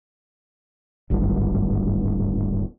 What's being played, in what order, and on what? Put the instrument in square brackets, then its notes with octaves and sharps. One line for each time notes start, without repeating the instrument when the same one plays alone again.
[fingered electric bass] D1 G#1 D2 G2